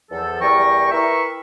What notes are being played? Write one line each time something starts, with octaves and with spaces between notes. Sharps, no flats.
E2 F3 A4
E2 G3 A#4 G5 A#5 C#6
E4 A#4 B4 E5 G5 C#6